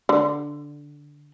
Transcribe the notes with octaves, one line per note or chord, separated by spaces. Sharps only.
D3